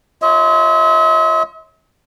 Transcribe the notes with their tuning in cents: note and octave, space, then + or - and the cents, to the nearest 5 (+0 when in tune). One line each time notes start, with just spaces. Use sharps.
F4 -15 C#5 +0 E5 -45